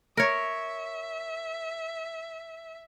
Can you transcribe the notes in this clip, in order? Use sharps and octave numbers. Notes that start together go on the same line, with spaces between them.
A#4 C#5 E5